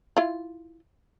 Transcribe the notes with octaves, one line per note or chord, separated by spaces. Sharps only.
E4 F4